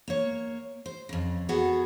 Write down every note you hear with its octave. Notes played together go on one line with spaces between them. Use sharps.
A#3 C#5
C5
F2 C#3
B3 F#4 G#4 A4